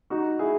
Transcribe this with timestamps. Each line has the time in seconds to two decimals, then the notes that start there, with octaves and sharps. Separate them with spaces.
0.10 D#4 F#4
0.39 E4 G#4